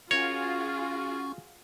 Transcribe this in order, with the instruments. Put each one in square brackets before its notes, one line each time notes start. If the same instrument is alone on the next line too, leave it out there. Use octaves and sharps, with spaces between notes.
[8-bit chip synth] C#4 C#6 [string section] F4 F#4 G#4 [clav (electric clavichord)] A#4 C#5